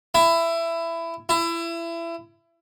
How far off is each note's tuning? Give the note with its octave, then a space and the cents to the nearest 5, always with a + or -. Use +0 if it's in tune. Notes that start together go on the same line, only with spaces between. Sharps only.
E4 +20
E4 +30